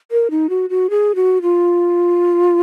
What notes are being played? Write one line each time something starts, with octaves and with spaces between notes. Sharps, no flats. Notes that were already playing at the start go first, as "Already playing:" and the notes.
A#4
D#4
F#4
F#4
G#4
F#4
F4